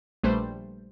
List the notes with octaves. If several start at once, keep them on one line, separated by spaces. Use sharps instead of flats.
A#1 G3 A3 B4 C5